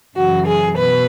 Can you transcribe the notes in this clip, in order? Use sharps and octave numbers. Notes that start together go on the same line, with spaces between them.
F#2 C#3 E3 F#4
G#4
B2 B4